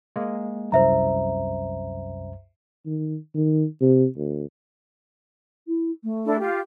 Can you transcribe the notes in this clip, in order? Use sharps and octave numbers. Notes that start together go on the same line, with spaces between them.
G#3 A#3
C2 F#2 C5 E5 A#5
D#3
D#3
C3
D2
E4
A3
D4 E4 A4
F4 G4